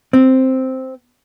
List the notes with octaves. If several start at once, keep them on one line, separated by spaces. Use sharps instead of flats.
C4